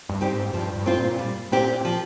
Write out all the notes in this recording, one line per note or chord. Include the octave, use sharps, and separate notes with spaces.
G2
C4 D#4 G4
G#2
G2 F3
G2
C4 F4
A#2
G3
A#2 C4 G4
F3